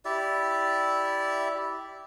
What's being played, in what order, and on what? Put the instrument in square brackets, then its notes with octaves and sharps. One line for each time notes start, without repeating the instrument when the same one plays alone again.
[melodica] E4 G4 D5 E5